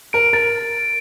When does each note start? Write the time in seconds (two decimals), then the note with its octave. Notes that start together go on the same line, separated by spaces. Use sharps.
0.13 A#4 D7
0.33 A#4 A6